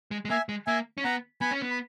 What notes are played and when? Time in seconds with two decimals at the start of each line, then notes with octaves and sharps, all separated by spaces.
0.11 G#3
0.25 G#3
0.30 A#3 E5 G#5
0.49 G#3
0.67 A#3 E5 G#5
0.98 C#4
1.04 B3 F#5 A#5
1.41 B3 G#5 B5
1.51 C#4
1.62 B3
1.70 B5